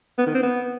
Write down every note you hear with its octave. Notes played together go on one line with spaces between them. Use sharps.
B3
D#3
C4
B3